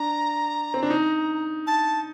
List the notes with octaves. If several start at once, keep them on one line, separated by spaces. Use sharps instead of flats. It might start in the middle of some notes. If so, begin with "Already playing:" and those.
Already playing: D4 A#5
C4
D4
D#4
A5